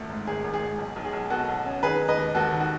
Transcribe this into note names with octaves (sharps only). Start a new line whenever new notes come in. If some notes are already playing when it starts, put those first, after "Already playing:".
Already playing: G#1 C#2 A3
G#2
G#1 G#4
G#1
G#4
G#2
B1
B1
G#4
B1
B2 F#4 A4
B1
C#4
D#3 G#4 B4
D#3
B4 D#5
D#2
D#2 F#4 A4
D#3
F#4